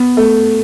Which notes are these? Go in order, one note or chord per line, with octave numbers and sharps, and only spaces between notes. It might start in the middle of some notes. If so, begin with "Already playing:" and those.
Already playing: B3
A3